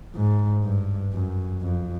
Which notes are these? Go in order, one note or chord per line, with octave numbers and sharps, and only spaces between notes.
G#2
G2
F#2
F2